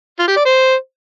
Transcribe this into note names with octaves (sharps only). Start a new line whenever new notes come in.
F4
G4
D5
C5